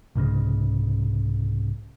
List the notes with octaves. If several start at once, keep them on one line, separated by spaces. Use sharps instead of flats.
C2 G#2 C#3 G#3